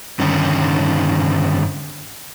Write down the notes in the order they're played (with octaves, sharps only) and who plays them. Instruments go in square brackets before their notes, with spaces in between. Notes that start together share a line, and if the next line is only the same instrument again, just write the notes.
[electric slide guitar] G2 D3 D#3 C#4 D#4